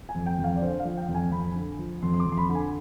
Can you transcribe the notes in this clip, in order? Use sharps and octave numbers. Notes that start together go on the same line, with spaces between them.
G#5
F2
G5
F2
F5
D5
D3 C5
F5
F3
G5
F2
G#5
F2 B5
D3
F3
F2 C6
C6
D6
F2
C6
B5
D3 B5
G#5